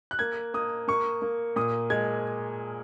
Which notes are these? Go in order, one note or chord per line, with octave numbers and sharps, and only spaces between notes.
F#6
A#3 G#6
A#3 D#6
A#3 C#6
A#3
A#2 D#6
G#3 G#6